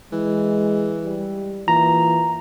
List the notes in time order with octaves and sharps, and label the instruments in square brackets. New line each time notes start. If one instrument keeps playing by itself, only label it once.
[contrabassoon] E3 [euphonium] G#3
[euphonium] G3
[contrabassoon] A#2 [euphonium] E3 [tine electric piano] A#5